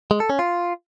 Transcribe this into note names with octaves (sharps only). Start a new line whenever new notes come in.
G#3
A4
C#4
F4